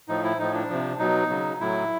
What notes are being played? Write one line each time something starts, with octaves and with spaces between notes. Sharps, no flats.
A2 F3 D#4
E4
A2 F3 D#4
D4
C3 F3
B2 F#3 D#4
C#3 F#3
A2 F#3 E4